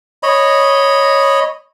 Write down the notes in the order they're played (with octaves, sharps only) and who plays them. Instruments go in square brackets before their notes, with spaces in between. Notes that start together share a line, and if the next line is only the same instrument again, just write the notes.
[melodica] C#5 D#5 B5